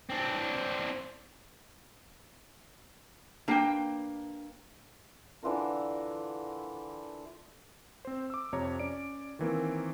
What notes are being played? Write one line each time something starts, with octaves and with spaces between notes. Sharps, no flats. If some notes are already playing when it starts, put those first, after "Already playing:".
C4 D4
A#3 D4 B4 G5 A5
D3 E3 F4 A#4
C4 C5
D6 E6
F2 C3 C#5 A#5
C#4 D5 D7
D#3 E3 A#3 C4